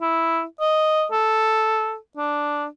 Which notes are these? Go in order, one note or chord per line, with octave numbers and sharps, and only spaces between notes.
E4
D#5
A4
D4